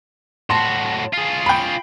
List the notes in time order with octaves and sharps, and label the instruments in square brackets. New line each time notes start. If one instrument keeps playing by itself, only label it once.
[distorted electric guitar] A2 F#4 [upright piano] A5 C6
[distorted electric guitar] F4 G#4
[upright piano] G5 B5